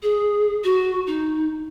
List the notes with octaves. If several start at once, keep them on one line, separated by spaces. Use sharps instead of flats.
G#4
F#4
D#4